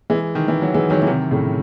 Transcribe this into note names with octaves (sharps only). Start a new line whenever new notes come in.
E3 G#3
D#3
E3
F#3
E3 G#3
D#3 F#3
E3
C3 D#3
A2 C#3